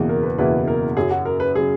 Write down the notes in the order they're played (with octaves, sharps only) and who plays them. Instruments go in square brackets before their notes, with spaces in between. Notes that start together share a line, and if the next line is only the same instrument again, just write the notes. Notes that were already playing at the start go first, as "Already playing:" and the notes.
Already playing: [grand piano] F#1 E2 B2 A#3 E4
[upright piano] A#4
B4
[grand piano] F#1 E2 B2 A#3 E4 [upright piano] B4
[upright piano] A#4
[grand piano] F#2 C#3 F#3 [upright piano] G#4
[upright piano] F#4
A#4
B4
[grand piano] C#3 F#3 [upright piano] G#4